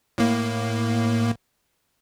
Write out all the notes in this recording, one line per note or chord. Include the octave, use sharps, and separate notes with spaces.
A2 A#3